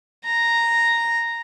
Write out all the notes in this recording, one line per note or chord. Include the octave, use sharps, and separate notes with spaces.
A#5